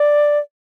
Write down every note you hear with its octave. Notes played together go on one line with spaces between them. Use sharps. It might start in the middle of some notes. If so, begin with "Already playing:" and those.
Already playing: D5